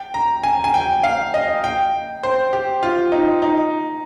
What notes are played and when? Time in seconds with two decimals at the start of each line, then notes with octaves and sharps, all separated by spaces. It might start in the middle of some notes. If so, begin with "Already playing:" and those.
Already playing: G5
0.14 A#5
0.43 G#5
0.64 G#5
0.74 G5
1.03 F5
1.34 D#5
1.64 G5
2.23 C5
2.53 G4
2.83 F4
3.12 D#4
3.42 D#4